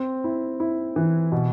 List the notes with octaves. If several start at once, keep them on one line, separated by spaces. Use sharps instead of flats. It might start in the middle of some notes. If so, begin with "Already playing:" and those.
Already playing: C4
E4
E4
E3
B2